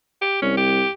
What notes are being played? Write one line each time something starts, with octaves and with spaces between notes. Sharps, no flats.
G4
C2 C#4
G4